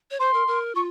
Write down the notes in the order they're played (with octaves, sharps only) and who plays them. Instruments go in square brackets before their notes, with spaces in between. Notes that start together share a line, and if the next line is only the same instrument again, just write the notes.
[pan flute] C#5
[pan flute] C5 [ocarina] C6
[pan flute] A#4
A#4
[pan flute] F4 [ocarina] C#6